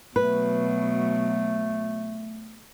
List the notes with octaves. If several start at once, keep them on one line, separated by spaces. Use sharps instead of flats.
B2 F#3 A3 B4